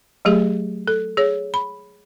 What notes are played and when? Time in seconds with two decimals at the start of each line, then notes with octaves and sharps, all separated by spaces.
0.25 F#3 A3 G4 G#4
0.88 A4
1.17 G#4 C#5
1.54 B5